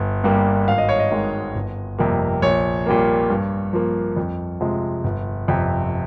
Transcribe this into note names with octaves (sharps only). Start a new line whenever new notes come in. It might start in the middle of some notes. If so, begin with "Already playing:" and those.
Already playing: G1
G2 G3 A#3
G#1 F5
D#5
C#5
D#5
G#2 D#3 G#3
G1
F2 C3 G3 A#3
A#1 C#5
A#2 G3 A#3
G2
F3 A#3
F2
C3 F3 G#3
G1
F2 C3